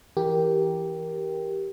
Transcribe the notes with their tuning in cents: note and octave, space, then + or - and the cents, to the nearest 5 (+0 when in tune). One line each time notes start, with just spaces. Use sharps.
E3 +0 G4 +0 A#4 +5